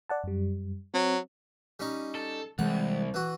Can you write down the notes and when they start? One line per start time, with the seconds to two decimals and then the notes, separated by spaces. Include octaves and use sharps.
0.09 D5 F#5 A5
0.24 F#2 G3
0.94 F#3 C4
1.80 G3 C#4 D#4
2.15 A4
2.59 C2 E3 G#3 F#5
3.14 E3 F#4